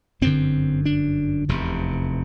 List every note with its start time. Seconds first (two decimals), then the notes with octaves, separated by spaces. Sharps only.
0.21 G1 F#2 D3 C4
0.86 D4
1.49 F1 E2 C3